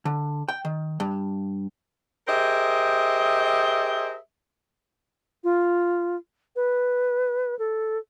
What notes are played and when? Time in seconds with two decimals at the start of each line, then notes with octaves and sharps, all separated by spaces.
0.05 D3
0.49 G5
0.65 D#3
1.00 G2
2.28 G4 G#4 A#4 C5 D#5 E5
5.44 F4
6.56 B4
7.59 A4